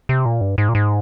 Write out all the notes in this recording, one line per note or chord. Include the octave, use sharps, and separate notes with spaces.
C3
A#2
G2
G#2
A#2
G#2